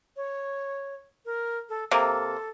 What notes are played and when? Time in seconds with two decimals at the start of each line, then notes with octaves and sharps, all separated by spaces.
0.17 C#5
1.26 A#4
1.69 A4
1.91 C3 A#3 A4